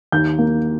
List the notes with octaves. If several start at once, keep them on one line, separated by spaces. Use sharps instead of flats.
D#2 G6
A#3